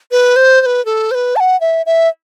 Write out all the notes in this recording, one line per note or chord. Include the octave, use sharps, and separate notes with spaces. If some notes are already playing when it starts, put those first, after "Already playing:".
B4
C5
C5
B4
A4
C5
B4
A5
F#5
E5
E5